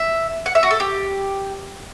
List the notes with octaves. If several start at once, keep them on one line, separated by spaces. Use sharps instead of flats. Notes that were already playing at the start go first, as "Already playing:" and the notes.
Already playing: E5
F#5
E5
F#4
A4
G4